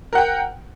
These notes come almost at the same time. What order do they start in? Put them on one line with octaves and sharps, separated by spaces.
A#4 F#5 G5